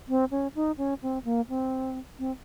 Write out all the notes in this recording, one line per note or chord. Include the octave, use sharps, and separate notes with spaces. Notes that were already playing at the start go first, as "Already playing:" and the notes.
C4
C#4
D#4
C#4
C4
A#3
C4
C4